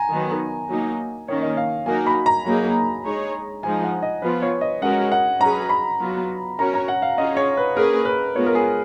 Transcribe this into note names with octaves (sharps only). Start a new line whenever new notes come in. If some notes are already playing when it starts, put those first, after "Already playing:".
Already playing: G#5 A#5
D#3 F#3 B3
F#3 A#3 D#4
D#3 A#3 C#4 C#5
D#5
F5
F#3 A#3 D#4 F#4 A#4 G#5
B5
A#5
F#3 A#3 D#4 G#4
G#3 D#4 G#4 C#5
F3 G#3 D#4 G#5
F#5
D#5
F3 B3 F4 B4
C#5
D#5
G#3 C#4 F#4 A#4 F#5
F#5
F#3 C#4 G#4 B4 A#5
B5
F#3 B3 F4
C#4 F#4 A#4 C#5 A#5
A#5
F#5
F5
C#4 F4 G#4 D#5
C#5
B4
A#3 C#4 G#4 A#4 B4
B4
G#3 B3 F4 C#5
A#4
G#4